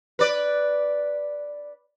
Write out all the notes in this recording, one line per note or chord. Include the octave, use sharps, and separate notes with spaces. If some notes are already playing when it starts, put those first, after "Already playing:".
B4 D5